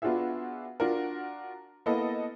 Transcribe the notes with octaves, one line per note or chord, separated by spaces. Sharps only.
B3 D4 F4 F#4 G#4 E5
D4 F4 F#4 A#4
A#3 B3 E4 A4 D#5